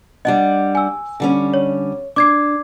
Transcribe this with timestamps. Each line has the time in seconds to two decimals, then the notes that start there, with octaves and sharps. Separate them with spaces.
0.25 G3 D4 D#5 F#5
0.75 G#5 E6
1.20 D3 G3 C#4
1.54 C#5
2.16 D4 D6 G#6 C7